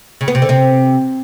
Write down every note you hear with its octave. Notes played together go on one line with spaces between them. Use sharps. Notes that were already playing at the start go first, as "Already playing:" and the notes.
C#3
B3
C3
D3
C3